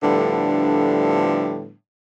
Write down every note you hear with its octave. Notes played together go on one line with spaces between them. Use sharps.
A2 D3 F3 G3 B3 D4